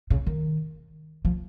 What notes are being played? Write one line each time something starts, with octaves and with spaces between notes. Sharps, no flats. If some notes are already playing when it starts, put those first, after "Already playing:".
C#3
D#3
F3